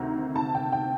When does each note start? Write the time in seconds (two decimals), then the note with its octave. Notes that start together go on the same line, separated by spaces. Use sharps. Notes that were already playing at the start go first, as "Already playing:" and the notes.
Already playing: D2 C3 D#3 A#5
0.36 A5
0.54 G5
0.72 G5